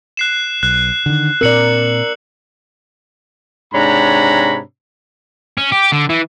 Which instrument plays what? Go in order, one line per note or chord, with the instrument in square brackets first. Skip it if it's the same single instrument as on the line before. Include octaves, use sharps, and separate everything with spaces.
[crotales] F#6 C7 E7
[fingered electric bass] B1 [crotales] F#6
[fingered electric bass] D3 D#3
[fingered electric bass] A#2 C4 [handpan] A#4 D5 [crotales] E6 C#7 F#7
[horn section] G#2 C3 D4 C#5 A#5 B5
[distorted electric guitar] C#4
G4
D3
E3